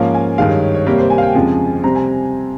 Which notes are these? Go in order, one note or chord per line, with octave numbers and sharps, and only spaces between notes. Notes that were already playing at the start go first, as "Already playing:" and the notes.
Already playing: G#2 F3 A#3 C#4 F5
G#5
G2 D#3 G#3 F5
C#5
C#5
C#5
C3 G3 A#3 C#5
C5
G#5
F5
G5
F2 C#3 F3 G#3 C4 G#5
C3 G3 C4 A#5
G#5